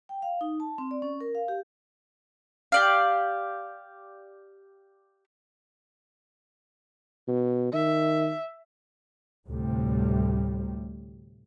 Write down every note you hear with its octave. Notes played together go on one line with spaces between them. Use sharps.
G5
F5
D#4
A5
C4
D5
C#4
A#4
F5
G4
G4 D5 F5
B2
D#3 E5
D2 A2 C3 G3